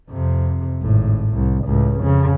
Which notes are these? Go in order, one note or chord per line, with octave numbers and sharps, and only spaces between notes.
F2 C3
G#1 A2
C2
C#2 A2
F2 C#3